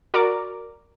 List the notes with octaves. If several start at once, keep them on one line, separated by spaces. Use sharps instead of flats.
F#4 A#4 D5 A#5 D6